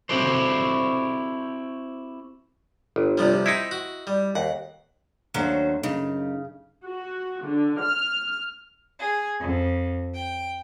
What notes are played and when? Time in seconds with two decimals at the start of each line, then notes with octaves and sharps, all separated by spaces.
0.09 C4 E4 F#4 G4 A4 C5
2.96 G1
3.18 C3 F3 G3
3.46 C4 D#4 E4 E5
3.71 F#4
4.07 G3
4.35 D#2 F#5
5.34 D#2 F#3 A3 C#4 D4 C5
5.83 F#2 C#3 D#4
6.84 F#4
7.44 D3
7.80 F6
8.99 G#4
9.41 F2
10.14 G5